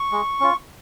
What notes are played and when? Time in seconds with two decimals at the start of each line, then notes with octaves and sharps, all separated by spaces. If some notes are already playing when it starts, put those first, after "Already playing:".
Already playing: C#6
0.12 G#3
0.40 C#4 F4